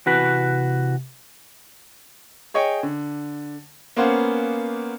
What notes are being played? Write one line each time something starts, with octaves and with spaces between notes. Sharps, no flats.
C3 E3 F#4 B4
G#4 C#5 D#5 G5
D3
A#3 B3 C#4 C5 F#5